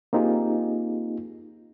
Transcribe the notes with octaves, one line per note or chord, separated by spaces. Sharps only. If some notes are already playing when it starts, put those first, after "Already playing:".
A#3 C4 D#4 F4 G4 G#4